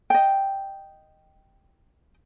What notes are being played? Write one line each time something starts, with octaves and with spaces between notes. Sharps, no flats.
D#5 G5